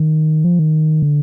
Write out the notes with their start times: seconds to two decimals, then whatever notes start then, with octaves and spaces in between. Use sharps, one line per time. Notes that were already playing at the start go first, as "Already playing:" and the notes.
Already playing: D#3
0.44 F3
0.59 D#3
1.02 D3